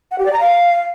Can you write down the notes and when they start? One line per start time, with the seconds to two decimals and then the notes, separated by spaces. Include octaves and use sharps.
0.11 F#5
0.18 G4
0.26 D5
0.33 A#5
0.40 F5